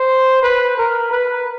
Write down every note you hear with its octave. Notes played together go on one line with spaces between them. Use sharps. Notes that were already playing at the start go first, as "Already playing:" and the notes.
Already playing: C5
B4
A#4
B4